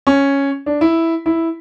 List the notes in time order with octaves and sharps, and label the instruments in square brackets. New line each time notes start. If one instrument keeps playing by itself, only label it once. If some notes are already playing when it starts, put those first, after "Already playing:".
[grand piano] C#4
D4
E4
E4